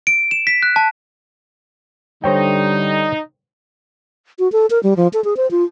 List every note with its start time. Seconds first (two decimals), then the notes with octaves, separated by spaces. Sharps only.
0.07 D7
0.31 E7
0.47 B6
0.63 F#6
0.76 A5
2.24 D3 G3 D#4 C5 C#5 G5
4.39 F#4
4.52 A4
4.70 A#4
4.83 G3
4.97 F3
5.13 A4
5.24 G#4
5.37 C5
5.51 F4